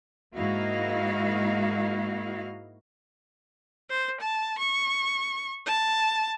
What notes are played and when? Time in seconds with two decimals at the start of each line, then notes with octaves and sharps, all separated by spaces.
0.36 G#2 A#3 E4 F#4 D#5 F5
3.90 C5
4.20 A5
4.58 C#6
5.66 A5